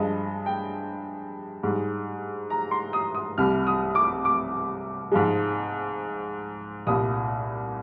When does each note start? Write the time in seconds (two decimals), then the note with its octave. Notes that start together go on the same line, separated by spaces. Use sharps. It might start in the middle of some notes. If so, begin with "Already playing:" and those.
Already playing: G2 F3 G#3 D#5
0.46 G5
1.63 G#2 G3
2.50 A#5
2.71 C6
2.93 D#6
3.15 D#6
3.38 C2 C3 G3 F6
3.67 D#6
3.95 D6
4.25 D6
5.12 G#2 F3 G#3
6.86 C2 A#2 G3 D#6